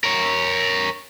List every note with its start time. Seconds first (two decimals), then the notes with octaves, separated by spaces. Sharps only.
0.04 A#4 C#5